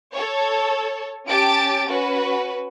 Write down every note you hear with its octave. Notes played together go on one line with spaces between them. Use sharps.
A4 C#5
C#4 G4 A5 A6 D7
C#4 F#4 B4